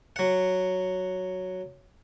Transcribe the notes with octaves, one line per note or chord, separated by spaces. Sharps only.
F#3 F#5